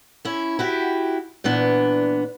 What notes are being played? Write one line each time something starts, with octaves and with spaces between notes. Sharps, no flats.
C#4 E4
E4 F#4 G4
A#2 E3 B3 D4